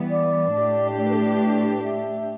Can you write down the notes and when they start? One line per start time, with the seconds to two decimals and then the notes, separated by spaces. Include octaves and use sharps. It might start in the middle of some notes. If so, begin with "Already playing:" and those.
Already playing: E3 G3 B3
0.09 D5
0.53 A2 A3 D4 G4
0.96 D5
1.04 B4
1.12 A4
1.20 B4
1.83 E5